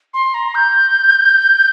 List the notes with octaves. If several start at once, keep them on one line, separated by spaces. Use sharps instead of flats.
C6
A#5
G6